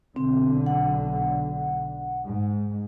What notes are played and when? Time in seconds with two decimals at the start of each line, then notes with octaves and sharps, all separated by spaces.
0.16 B1 D3 C4
0.66 F#5
2.27 G#2